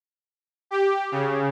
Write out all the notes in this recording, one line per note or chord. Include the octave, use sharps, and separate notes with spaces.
G4
C#3